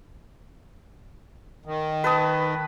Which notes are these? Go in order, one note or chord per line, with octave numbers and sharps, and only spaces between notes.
D#3
B4 A5 D#6